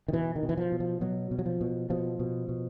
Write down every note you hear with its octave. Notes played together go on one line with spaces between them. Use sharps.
D#3
B2 E3
D#3
B2
E3
F3
B2
F3
B2 F#3
B2
F#3
F3
B2
B2 F3
B2
B2